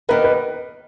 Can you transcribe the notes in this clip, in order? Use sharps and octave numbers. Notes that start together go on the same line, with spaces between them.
D#2 D#3 B3 D#4 B4
B4